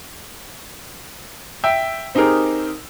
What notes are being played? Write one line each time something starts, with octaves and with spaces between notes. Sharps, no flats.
E5 G5
C4 D#4 G4 G#4 A#4